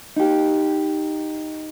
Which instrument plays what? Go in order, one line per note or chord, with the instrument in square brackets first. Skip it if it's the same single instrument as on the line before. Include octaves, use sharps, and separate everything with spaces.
[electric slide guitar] D#4 G4